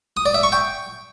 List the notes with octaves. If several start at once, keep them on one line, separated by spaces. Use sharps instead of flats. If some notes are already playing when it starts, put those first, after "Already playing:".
D#6
D5
E5
C#6
G5